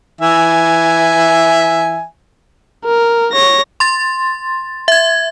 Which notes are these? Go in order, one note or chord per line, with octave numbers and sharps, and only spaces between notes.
E3 E5 G#5
A#4
C#5 A#6
C6 A6
E5 G#6